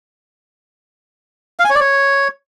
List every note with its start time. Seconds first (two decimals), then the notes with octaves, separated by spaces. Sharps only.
1.59 F5
1.65 G#5
1.70 C#5
1.75 D5
1.80 C#5